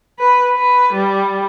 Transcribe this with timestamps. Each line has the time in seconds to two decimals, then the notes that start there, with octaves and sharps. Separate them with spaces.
0.19 B4
0.55 B4
0.93 G3